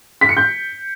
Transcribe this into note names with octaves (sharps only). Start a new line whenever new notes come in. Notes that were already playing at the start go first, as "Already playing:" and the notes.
B6
C#7
G6